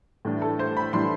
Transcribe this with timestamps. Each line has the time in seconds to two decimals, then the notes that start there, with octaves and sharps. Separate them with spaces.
0.25 A2 E3 G3 D4
0.42 A4
0.59 C5
0.77 B5
0.93 A2 E3 G3 D4 C6